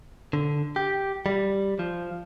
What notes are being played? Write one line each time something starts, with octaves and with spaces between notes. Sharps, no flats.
D3
G4
G3
F3